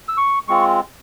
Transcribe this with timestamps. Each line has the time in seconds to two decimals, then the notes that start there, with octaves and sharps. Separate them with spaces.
0.08 E6
0.17 C#6
0.48 G#3 C4 F4 C#6